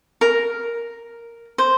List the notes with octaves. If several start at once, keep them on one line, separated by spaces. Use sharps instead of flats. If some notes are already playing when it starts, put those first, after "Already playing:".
A#4
C5